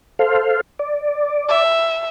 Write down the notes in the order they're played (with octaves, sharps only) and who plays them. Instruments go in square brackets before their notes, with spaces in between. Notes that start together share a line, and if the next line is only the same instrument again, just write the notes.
[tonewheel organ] A4 C5 F5
D5
[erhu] E5